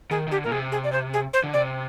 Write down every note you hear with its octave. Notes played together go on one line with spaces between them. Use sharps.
D#3 G#4
D#3
D3 G4
A#2 A#4
C3 G#4
G#4
D5
C5
G#4
C5
D3
C3 D5